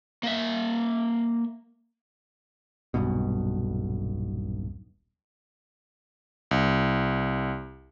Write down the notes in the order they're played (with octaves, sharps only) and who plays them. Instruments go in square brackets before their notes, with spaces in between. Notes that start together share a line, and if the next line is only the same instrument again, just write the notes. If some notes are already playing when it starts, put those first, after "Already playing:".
[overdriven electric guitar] A#3 E5
[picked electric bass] D#1 B1 G2 B2
[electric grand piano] C2